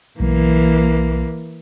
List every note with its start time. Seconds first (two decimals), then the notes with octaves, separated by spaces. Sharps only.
0.20 B1 E3 A#3